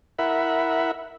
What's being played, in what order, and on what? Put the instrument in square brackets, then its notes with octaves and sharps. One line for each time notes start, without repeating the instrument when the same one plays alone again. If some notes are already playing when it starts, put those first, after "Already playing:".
[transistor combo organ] E4 A#4 E5 F#5 B5